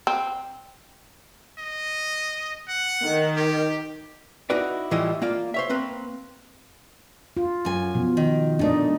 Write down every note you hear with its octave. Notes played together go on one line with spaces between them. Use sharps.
C4
D#5
F#5
D#3
G4
D#4 E4 F#4 B4 D5
A2 E3 F3 G3 E4 D#5
A#3 F4 D5 F5
C5 C#5 E5
A#3 C4 B4
F4
F#2 G#5
B2 F3
D#3
A#2 A3 D4 D#4 D#5